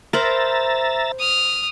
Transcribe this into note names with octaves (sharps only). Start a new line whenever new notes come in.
A#4 C5 E5 A#5 B5 A6
D#6 F6